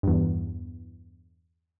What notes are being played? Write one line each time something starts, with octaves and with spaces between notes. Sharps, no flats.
E2 G2